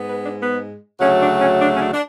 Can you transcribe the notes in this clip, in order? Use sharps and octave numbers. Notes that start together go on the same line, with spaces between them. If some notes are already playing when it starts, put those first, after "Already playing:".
Already playing: G#2 G#3 B3
B4
D4
B3
D2 C#3 F#3 A3 C#4
D4
C#4
D4
C#4
D4
D4